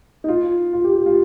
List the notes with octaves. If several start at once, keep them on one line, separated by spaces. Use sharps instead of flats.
D#4
F4
F4
G4
G4
F4